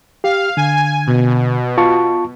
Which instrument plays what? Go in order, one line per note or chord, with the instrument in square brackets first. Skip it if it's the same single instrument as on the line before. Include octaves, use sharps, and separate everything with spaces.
[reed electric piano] G4 [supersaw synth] F5
[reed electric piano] D3 [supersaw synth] G#5
[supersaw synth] B2
[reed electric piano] F4 A5 C#6